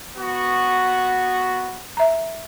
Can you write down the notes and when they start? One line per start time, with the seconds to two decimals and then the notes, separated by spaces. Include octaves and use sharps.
0.17 B3 F#4
1.97 E5 A#5